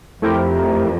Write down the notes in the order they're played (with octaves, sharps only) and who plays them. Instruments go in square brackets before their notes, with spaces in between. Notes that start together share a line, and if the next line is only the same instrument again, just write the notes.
[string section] F2 [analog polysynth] A3 C4 E4 G4 A#4